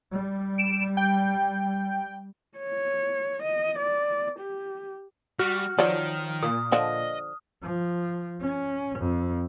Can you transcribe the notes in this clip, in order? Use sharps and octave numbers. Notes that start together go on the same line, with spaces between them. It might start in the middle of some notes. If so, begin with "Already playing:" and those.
G3
D7 E7
G5
C#5
D#5
D5
G4
G3 F#4 F6
D#3 F3 F#3 D5
A#2 D#6
D3 F3 D4 D#5
F3
C#4
F2